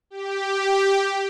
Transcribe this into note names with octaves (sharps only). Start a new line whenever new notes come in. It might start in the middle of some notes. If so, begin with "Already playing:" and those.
G4